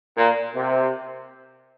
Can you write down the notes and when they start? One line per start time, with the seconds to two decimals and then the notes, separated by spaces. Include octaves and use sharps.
0.17 A#2
0.55 C3